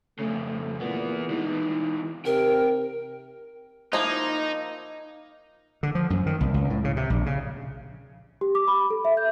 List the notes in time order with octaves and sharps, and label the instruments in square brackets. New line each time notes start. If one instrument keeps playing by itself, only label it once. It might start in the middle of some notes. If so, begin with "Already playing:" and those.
[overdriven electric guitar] F2 C#3 [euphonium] A3
[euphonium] A#2 [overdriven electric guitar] E3 B3
[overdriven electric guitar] E3 G#3 [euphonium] D#4
[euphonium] C3 [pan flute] A#4 [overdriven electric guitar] G5
[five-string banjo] F3 A#3 E4 [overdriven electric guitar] D#4
[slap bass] D3
F3
F#2
D#3
C2
C#2
A2
C#3
C3
A#1
C#3
[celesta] G4
D6
B5
A4
E5
G6